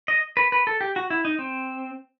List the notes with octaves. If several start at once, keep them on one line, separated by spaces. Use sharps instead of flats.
D#5
B4
B4
A4
G4
F#4
E4
D#4
C4